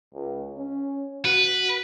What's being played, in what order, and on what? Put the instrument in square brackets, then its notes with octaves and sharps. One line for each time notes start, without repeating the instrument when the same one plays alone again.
[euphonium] C#2
C#4
[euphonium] F#4 [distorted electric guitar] B4